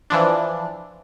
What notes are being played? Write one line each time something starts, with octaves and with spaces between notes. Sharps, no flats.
E3 F3 D4